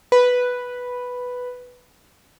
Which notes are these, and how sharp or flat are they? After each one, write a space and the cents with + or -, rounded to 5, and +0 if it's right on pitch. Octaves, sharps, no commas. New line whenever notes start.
B4 +0